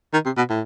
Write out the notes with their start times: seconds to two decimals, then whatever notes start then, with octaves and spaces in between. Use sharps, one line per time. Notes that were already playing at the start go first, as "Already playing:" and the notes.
0.13 D#3
0.26 C3
0.37 B2
0.50 A2